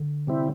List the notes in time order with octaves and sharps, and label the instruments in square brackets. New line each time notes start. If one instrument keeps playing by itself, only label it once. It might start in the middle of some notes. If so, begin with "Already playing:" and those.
Already playing: [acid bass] D3
[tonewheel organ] C3 G3 C4 E4